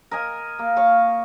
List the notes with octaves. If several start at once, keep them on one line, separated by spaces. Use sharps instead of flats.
A#4 D#5 G#5
A#3
C#5 F5 C#6